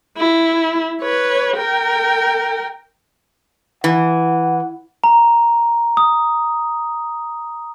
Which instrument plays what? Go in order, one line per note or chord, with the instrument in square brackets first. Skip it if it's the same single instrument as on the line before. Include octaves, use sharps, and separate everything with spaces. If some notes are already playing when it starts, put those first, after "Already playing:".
[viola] E4
B4 C#5
A#4 G5
[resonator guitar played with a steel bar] E3 [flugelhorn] F#5
[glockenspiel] A#5
D#6